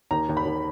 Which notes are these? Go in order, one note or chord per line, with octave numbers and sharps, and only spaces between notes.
D#2 A#5
D#2
B5
D#2